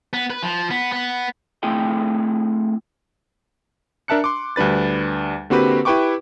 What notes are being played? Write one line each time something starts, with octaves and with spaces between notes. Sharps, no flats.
B3
B4
F3
B3
B3
A3 C4 E4 G#4 D#5 G5
D4 A#4 E5 A5 F#6 C#7
C6 D6
D2 G3 D4 B4 A6
D3 A#3 C4 F#4 G4 B4
E4 G4 B4 G5 C#6 D6